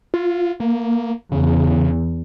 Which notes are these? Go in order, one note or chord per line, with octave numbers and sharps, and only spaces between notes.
F4
A#3
E2 C#3